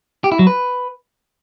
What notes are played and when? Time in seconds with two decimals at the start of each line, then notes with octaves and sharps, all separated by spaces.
0.24 G4
0.32 E4
0.39 F#3
0.47 B4